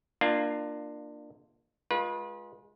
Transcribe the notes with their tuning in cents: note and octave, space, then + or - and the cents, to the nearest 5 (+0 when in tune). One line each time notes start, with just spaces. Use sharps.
A#3 +0 D4 +25 F4 -10
G#3 +0 F4 +20 B4 -35